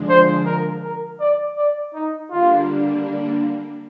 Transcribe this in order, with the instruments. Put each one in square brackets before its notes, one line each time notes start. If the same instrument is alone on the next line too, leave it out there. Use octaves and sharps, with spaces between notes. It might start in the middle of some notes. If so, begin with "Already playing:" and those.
Already playing: [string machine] D3 F3 G#3 D4
[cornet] C5
A#4
A#4
D5
D5
D#4
[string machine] D3 G3 A#3 D4 [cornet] F4